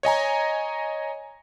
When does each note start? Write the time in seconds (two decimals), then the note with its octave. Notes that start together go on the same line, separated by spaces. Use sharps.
0.03 C#5 D#5 G#5 A#5